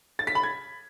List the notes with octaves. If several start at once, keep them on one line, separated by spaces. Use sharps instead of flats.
A6
B6
B5
G#6